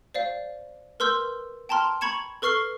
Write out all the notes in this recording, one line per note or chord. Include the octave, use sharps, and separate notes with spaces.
C5 D5 F5
A#4 B4 C6 E6 G6
G5 A5 A#5 C6 F6
A#5 B5 C#6 G#6 C#7 E7
A4 B4 C#6 F6 C7 G7